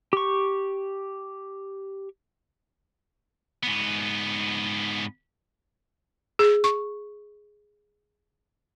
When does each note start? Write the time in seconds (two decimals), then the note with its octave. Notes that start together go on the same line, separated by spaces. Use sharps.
0.13 G4 C#6
3.63 G#2 B3
6.39 G#4
6.64 C#6